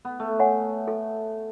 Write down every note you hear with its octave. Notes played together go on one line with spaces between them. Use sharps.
B3
A3
C#5 F#5 G#5
A4